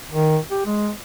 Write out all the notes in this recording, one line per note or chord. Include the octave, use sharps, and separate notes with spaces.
D#3
G4
G#3